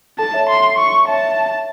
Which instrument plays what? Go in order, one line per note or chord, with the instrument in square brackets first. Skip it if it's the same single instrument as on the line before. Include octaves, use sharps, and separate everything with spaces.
[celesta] A4 [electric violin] A5
[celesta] C#5 E5
[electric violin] C6
C#6
[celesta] C#5 E5 [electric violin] A5